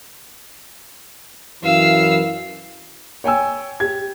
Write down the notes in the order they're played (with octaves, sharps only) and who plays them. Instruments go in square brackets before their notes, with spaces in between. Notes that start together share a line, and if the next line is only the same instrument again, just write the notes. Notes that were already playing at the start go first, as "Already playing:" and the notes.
[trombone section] F#2 E3 [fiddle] F5 E6
[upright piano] C#5 G5 G#5 E6
G4 G#6